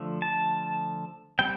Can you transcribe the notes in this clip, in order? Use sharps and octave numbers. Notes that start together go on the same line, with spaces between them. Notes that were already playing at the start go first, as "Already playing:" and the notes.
Already playing: D3 F3 A3
A5
G3 C4 G5